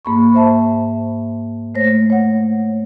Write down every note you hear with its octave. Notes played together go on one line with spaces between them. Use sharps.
G#2 A#3 B5 C#6
C5 E5 A5
A3 C5 C#5 A#6
C#5 F#5